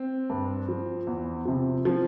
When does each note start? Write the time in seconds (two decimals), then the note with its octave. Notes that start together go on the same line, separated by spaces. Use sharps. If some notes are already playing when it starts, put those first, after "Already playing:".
Already playing: C4
0.30 G2
0.69 F3
1.07 E2
1.46 C3 F3
1.85 F3